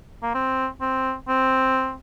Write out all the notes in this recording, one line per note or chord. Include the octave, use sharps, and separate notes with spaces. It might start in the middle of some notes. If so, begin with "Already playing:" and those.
A#3
C4
C4
C4